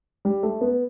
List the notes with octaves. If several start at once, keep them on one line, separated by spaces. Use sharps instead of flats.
G3
A3
B3